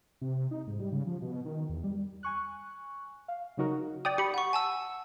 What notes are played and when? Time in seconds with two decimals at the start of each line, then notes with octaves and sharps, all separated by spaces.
0.21 C3
0.51 D#4
0.67 G#2
0.80 G3
0.92 C#3
1.07 F3
1.22 B2
1.45 D#3
1.69 E2
1.84 G3
2.23 G#5 C#6 F#6
3.28 F5
3.57 C#3 F#3 D#4 F#4 A#4
4.05 D5 G5 D#6
4.18 G4 B5 C#7
4.34 F#5 C#6
4.53 G#5 A5 E6